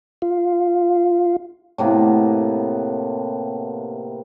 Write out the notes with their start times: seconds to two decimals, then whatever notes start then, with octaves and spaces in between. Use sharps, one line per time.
0.22 F4
1.78 A2 C3 A#3 B3